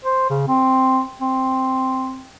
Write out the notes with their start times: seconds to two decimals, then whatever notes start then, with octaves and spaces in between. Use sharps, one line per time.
0.05 C5
0.30 C#3
0.48 C4
1.21 C4